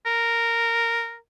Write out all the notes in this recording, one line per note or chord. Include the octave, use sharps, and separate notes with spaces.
A#4